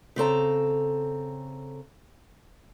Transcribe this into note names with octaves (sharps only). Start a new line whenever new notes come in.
C#3 C4 A4 A#5